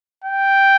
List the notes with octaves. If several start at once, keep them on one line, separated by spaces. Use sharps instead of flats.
G5